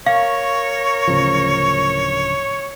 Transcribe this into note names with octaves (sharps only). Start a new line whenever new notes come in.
A#4 C#5 F5 C#6
D1 C#3 F3